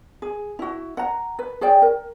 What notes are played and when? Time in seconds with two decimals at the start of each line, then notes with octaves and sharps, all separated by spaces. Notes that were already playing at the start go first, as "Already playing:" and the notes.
0.22 G#4
0.59 E4 F#4
0.97 F#5 A#5
1.39 B4
1.61 G#4 C#5 D5 G5
1.82 A#4